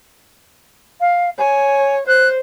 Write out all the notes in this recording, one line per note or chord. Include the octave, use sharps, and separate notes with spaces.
F5
C#5 G#5
C5 F#6